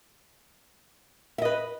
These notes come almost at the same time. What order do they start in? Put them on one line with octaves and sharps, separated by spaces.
E5 D#5 B4